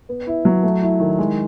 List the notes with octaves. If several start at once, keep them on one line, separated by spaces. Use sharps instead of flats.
B3
E4
F#3
A3
E4
D#3
G#3